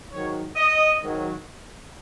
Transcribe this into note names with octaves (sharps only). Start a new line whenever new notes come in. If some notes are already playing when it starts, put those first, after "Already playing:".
G#2 D#3 F#3 C#5
D#5
G#2 D#3 F#3